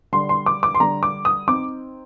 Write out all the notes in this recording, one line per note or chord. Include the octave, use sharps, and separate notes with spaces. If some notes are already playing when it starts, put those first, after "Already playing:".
D3 G3 D4 C6
C6
D6
D6
C6
D3 G3 D4 A#5
D6
D#6
C4 D#4 D6